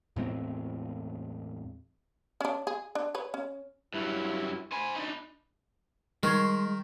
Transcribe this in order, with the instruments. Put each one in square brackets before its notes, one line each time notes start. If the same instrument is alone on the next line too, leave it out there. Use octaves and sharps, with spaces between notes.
[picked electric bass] E2 A2 G#3 C4
[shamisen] C#4 D4
G#4
D4
B4 C#5
C#4
[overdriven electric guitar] G2 F#3 [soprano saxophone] E4
[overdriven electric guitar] C5 G#5 [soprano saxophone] B5
[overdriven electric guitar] D4 D#4
[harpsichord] D#3 [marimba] G3 C#6 G#6 [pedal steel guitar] G#3 C6